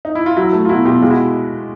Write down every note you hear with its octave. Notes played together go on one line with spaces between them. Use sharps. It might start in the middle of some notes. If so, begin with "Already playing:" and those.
D#4
E4
F4
F#3 E4 F#4
A3
F4
B2 E4 F#4
B2 F4 G4
G#3 F4 G4
E4 F#4